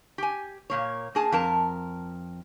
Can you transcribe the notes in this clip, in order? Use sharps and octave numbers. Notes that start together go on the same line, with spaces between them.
G4 G#5
A#2 A#3 C#5
A#3 G#4 A5
F2 A#4 A5